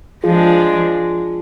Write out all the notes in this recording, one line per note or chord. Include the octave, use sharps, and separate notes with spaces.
F3 G#3 D4 F4 G#4